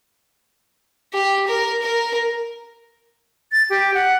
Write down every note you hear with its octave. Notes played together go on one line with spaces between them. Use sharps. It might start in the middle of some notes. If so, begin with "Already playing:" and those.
G4
A#4
A#4
A6
G4
F#5